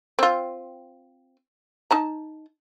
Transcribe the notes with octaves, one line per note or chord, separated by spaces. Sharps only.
C4 F4
D#4 A5 A#5